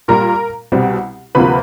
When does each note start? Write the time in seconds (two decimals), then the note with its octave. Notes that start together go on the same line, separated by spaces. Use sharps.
0.08 A#2 G3 A#3 A#4 A#5
0.72 C2 B2 G3 C4
1.35 D2 C3 F3 A#3 B4 B5